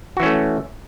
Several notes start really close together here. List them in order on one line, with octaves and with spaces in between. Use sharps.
F#4 E3 C#4 A3